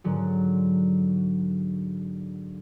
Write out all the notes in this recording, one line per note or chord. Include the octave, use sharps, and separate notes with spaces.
G#2 D3 F#3